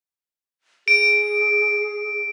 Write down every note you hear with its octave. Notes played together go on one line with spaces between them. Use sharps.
G#4 D7